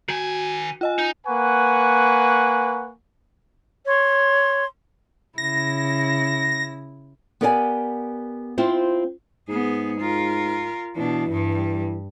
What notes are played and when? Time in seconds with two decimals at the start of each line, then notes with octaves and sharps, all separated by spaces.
0.09 D#3 F#4 G#5
0.81 F4 D#5 G#5
0.98 D#4
1.27 A#3 B4 F#5 G#5 C#6
3.87 C#5 C6
5.38 C#3 E4 A#6
7.41 B3 G4 A#4 D5 F5 G#5
8.58 C4 E4 F4 C5
9.48 G#2 B3 G#4
10.00 F4 A#4
10.96 B2 E3 D4
11.30 G2 G3